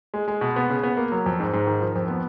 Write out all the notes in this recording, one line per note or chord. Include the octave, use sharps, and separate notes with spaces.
G#3
G#3
B2
B3
C#3
B3
A#3
F#3
F2
G#2
G#2
D#3
F3
F2
B3